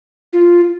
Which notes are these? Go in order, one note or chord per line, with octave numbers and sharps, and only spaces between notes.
F4